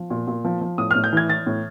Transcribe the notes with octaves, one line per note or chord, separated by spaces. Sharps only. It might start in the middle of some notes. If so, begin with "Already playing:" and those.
Already playing: F3
A#2
A#2
F3
F3
A2 D#6
F6
A2
G6
E3 G#6
E3 A6
A2